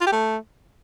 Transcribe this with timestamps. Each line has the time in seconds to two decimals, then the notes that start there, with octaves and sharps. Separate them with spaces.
0.01 F4
0.07 G4
0.12 A3